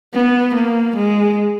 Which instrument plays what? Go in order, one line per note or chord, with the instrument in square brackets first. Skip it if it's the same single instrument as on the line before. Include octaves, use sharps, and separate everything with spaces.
[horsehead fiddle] B3
A#3
G#3